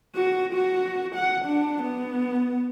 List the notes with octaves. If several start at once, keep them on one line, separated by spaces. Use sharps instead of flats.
F#4
F#4
F#5
D4
B3